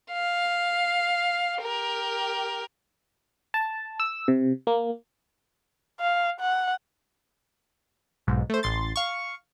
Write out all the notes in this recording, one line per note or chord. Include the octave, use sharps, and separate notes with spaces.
F5
G4 A#4
A5
E6
C3
A#3
F5
F#5
B1 G#2
A3 C5
A1 C6 A6
F5 C#6